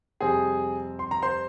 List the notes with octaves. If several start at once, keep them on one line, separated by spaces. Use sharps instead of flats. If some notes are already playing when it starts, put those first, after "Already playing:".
F2 C3 G3 C4 G#4 G#5
C6
A#5
C5 C6